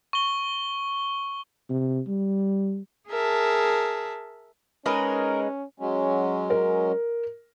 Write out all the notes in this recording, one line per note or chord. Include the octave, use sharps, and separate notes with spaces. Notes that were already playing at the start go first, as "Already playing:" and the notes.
C#6 G7
C3
G3
G#4 A#4 E5 A5
G#3 C#4 D#4 A#4 B4
F#3 G#3 C#4
A#4